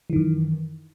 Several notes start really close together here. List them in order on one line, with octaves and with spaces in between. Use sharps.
E3 D#3 F#2